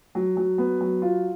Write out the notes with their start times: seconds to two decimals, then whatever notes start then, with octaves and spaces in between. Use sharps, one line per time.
0.15 F#3
0.37 F#3
0.58 B3
0.81 F#3
1.02 F4